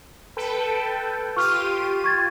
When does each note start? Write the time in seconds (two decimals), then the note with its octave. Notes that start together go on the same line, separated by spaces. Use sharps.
0.37 A4 B4 G5
1.37 F4 G4 C#6 F6 D#7
2.04 C#6 G#6 A6